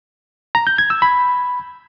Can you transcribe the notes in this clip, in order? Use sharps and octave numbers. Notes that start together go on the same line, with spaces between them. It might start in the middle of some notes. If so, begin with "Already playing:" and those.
A#5
G6
G#6
E6
B5